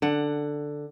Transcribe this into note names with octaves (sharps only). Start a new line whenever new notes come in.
D3 F#5